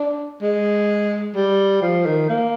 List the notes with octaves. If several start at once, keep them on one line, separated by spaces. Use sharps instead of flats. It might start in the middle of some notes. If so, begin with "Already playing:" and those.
Already playing: D4
G#3
G3
F3
D#3
A#3